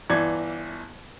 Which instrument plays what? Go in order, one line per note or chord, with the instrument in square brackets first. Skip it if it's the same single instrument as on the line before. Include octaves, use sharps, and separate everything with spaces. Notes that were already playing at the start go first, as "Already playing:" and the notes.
[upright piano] G1 E3 D5 G#6